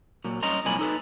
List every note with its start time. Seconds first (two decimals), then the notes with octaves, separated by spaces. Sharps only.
0.24 A#2 F#3
0.43 G2 C#4 D#5 A#5 C6
0.65 C2 A#2 F#3 G#5 B5
0.79 D#4 A4 B4